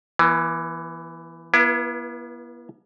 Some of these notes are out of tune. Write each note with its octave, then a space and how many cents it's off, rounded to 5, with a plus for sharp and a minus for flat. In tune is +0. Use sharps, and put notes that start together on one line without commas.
E3 +15 B3 -35
B3 -40 E4 +30 B4 +0